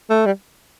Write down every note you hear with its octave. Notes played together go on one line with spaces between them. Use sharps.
A3
G3